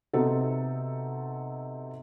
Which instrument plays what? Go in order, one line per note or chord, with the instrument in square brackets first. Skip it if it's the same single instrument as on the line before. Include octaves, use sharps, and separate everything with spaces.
[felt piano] C3 B3 C4 D#4 F#4 A4